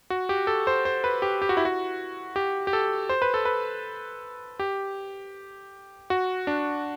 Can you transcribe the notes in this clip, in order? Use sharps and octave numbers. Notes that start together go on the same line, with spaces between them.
F#4
G4
A4
C5
C5
B4
G4
G4
F#4
E4
F#4
G4
G4
A4
C5
B4
A4
B4
G4
F#4
D4